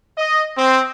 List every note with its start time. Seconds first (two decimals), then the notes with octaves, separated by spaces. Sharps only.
0.18 D#5
0.58 C4